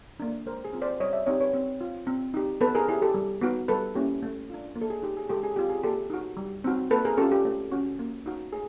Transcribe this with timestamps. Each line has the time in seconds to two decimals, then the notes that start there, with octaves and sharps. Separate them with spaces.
0.20 A#3 D4
0.46 G#3 A#4 C5
0.65 G#4
0.73 C4 F4
0.82 C5 D5
1.00 G3 C#5 D#5
1.13 D5 E5
1.26 C4 D#4 G4 C#5 D#5
1.40 B4 C#5
1.54 C4
1.81 F4
2.07 C4
2.34 D#4 G4
2.61 B3 A4 B4
2.75 G#4 A#4
2.88 E4 G4 G#4
3.02 G4 A4
3.14 G3
3.41 B3 D#4 F#4
3.68 G3 A4 B4
3.95 A#3 C#4 E4 G4
4.22 A3
4.50 D4 F4
4.76 A#3
4.81 A4
4.90 G#4
5.03 D#4 G4
5.17 G#4
5.29 G#3 G4 A4
5.43 G#4
5.56 C4 F4 G4
5.70 G#4
5.83 A#3 G4 A4
6.10 D#4 F#4
6.37 G3
6.64 C4 D#4 F#4
6.90 A#3 A4 B4
7.05 G#4 A#4
7.18 C#4 G4 A4
7.21 F4
7.32 G4
7.45 A3
7.72 C#4 F#4
7.99 A#3
8.26 D#4 F#4
8.52 A3 G#4